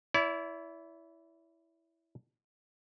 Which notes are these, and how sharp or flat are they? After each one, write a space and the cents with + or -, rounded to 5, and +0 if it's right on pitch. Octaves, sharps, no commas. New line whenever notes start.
E4 +0 D5 -45